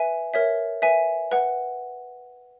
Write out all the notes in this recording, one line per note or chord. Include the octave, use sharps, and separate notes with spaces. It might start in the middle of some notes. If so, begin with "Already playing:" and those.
Already playing: B4 E5 G#5
A#4 C#5 E5
B4 E5 G#5
B4 F#5